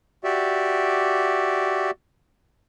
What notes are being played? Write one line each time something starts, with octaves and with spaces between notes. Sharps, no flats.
F#4 G4 D5 E5